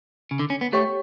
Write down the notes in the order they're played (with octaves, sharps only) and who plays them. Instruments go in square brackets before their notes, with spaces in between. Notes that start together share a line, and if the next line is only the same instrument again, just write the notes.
[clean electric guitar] C#3
D3
C#4
B3
[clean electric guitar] A3 [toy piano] G4 C#5 G5 C#6